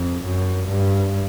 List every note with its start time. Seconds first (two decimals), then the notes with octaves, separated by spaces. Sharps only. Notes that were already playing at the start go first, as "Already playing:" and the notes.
Already playing: F2
0.23 F#2
0.68 G2